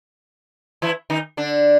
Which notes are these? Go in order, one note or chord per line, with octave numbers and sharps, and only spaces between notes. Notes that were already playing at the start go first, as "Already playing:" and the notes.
E3 E4
D#3 D#4
D3 D4